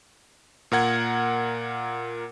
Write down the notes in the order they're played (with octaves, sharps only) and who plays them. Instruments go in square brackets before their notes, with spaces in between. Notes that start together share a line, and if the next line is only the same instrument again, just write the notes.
[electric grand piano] A#2 A#4 F#5 G#6